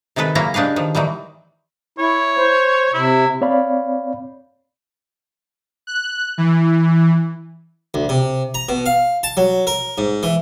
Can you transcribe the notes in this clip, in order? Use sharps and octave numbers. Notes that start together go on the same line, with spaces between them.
C3 D#3 G#3 A4 B4
C#3 F#3 A#3 C#4 E4 A#5
G#3 D4 G4 B4 F5
D#3 F3
D#3 E3 F#3 G3
E4 C#5
C5
C3 E4
C4 C#5 D5 F5 B5
F#6
E3
D2
C3
A#5
B2
F5
A5
F#3
A#4
G#2
E3